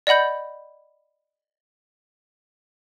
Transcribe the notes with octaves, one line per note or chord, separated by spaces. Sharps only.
D5 D#5 F#5 B5 G6